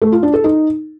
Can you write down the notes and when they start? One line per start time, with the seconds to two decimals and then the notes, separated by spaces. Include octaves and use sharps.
0.02 A3
0.12 F4
0.23 D4
0.34 A4
0.44 D#4